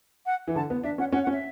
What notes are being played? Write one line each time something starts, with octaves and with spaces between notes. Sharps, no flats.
F#5
E3
D3 A5
B3
D4 E5
C#4 F#5
C#4 F#5
F#5
C#4
E5